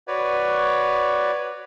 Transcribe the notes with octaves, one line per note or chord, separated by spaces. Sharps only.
F#4 B4 C#5 D5